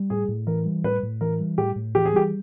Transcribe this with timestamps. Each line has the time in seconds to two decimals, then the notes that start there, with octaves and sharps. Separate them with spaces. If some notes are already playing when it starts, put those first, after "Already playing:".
Already playing: G3
0.10 A2 G#4
0.28 A2
0.47 E3 A#4
0.65 G3
0.84 A2 B4
1.03 A2
1.21 E3 A#4
1.39 G3
1.58 A2 G4
1.76 A2
1.95 E3 G4
2.06 G#4
2.13 G3 G4